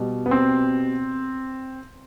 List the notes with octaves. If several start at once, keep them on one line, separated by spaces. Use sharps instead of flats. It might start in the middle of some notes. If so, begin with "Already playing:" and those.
Already playing: B2 G3
B3
C4